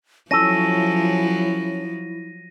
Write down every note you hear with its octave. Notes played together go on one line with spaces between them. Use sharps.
F3 F#3 C#4 E4 A4 A#6 D#7